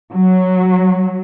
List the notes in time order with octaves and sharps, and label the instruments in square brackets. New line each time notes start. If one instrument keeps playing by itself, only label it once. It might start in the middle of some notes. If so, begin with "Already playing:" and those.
[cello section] F#3